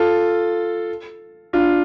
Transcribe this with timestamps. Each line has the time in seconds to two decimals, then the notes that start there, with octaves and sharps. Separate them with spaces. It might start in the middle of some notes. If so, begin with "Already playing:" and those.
Already playing: F4 A4
1.53 D4 F4